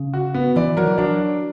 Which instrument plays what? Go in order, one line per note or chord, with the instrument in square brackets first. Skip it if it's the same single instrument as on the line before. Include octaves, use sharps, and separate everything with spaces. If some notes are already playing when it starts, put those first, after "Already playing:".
Already playing: [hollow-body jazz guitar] C#3
[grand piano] F#4
B3
[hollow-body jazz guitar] E3 [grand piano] D5
[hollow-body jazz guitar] F#3 [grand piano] A#4
[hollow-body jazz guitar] E3
[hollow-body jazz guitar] F#3 [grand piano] D4